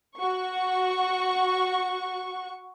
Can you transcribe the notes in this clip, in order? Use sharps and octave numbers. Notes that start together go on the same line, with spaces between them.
F#4 C#6